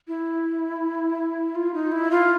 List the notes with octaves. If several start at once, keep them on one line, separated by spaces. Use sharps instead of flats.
E4
F4
D#4
E4
F4